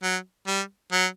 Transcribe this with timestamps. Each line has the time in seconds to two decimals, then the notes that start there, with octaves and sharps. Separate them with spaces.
0.03 F#3
0.47 G3
0.92 F#3